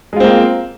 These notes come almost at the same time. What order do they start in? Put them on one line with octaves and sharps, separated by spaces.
G#3 F4 C4 A#3